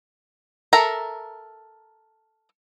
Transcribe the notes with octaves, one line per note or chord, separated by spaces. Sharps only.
A4 A#4 E5 A#5